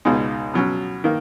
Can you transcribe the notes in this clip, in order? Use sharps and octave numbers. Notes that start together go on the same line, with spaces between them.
C#2 B2 G#3 D#4
B2 F#3 C#4
D#3 A#3